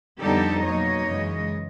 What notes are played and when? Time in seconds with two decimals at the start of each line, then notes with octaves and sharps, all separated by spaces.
0.20 F2 D3 G3 B3 D#4 G4 A4
0.64 B2 F#3 A#3 D#4 C#5 D#5
1.07 F#2 C#3 E3 G#3